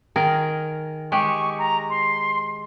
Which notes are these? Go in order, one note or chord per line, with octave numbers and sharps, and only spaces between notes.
D#3 G#4 A#4
G#3 G4 C#6
A#5
C6